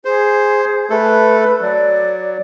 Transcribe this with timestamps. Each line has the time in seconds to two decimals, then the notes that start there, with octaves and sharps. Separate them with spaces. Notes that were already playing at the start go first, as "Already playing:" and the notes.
0.05 G#4 C5
0.90 A3 A4 B4
1.61 F#3 D5